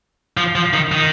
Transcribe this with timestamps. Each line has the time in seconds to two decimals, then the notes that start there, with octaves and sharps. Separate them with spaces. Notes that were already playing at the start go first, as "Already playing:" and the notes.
0.37 F3
0.55 F3
0.73 D#3
0.92 D#3